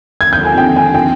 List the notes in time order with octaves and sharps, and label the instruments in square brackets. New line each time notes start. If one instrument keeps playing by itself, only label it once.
[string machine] D#2 D3 F3 C4 [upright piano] G#6
[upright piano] G6
G#5
G5
G#5
G5